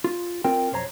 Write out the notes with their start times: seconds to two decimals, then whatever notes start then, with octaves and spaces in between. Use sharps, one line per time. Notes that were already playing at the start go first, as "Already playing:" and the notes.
0.04 F4
0.44 C4 F4 A#4 G5
0.72 B1 F2 C5 C#5 A#5